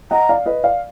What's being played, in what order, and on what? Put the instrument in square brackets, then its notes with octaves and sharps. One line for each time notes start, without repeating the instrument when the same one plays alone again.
[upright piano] D#5 F#5 [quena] A#5
[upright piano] D5 F5
B4 D#5
D5 F5